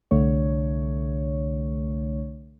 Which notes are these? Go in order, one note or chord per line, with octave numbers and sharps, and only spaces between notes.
C2 D3 A3 C#5